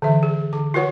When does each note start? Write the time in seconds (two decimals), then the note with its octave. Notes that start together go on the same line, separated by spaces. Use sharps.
0.02 D3 E3 E5
0.23 G#4
0.52 D3 D6
0.74 F4 F#4 A#4 B4 C#5 F#5